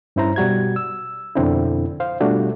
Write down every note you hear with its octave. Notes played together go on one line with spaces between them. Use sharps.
G2 C#4 E4 C5 A#5
B2 G3 F#4 G#6
E6
F2 B2 D3 C4 D4 E4
C5 F5
B2 G3 A3 D4 F4 F#4